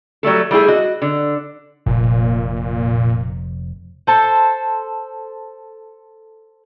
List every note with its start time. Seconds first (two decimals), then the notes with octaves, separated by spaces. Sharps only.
0.23 F#3 G3 A3 A4
0.51 G3 A3 E4 G#4
0.68 F#4 D#5
1.02 D3
1.86 F1 A#2
4.07 A4 C5